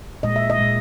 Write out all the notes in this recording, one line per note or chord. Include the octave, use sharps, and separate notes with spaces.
A#2 G#3 D#5
E5
D#5
A#2 G#3